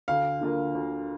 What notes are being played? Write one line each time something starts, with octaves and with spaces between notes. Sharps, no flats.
D2 F5
D3 A#3 F4 A#4
D2